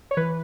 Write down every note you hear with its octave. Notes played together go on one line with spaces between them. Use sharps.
C#5
E3 B4